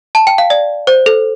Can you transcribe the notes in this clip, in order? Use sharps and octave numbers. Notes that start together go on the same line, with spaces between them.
A5
G5
F5
D5
C5
A4